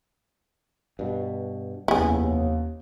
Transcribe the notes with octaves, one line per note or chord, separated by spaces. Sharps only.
G2 B2
F1 D#2 B3 C#4 E4 G#4